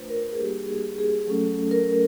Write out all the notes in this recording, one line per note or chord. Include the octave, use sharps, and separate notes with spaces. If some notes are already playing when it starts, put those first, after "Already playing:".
Already playing: A3 D4 F4 B4 C5
A#4
G#4
G3 A#3 D4 F#4 G4
G#4
G#4
F#3 A3 C#4 A4
A#4